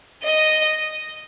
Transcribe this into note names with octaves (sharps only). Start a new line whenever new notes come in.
D#5